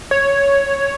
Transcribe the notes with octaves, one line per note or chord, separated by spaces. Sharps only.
C#5